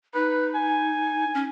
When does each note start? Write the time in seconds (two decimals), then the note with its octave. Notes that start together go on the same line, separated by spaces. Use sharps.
0.14 D#4 B4
0.55 G#5
1.34 C#4